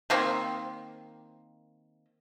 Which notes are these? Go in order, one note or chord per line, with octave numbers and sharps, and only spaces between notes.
D#3 A#3 C4